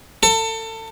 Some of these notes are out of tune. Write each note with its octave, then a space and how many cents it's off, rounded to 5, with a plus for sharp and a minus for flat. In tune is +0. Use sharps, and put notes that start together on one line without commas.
A4 +30